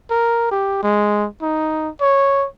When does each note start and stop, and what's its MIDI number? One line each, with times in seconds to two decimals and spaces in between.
0.10 0.49 70
0.51 0.78 67
0.83 1.27 56
1.42 1.89 63
2.01 2.47 73